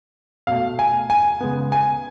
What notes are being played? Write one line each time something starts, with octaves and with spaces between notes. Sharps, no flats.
B2 A3 F5
G#5
G#5
C#3 G#3 B3
G#5